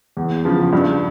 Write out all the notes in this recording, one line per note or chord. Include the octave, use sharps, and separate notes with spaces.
E2
C#3 F3
G2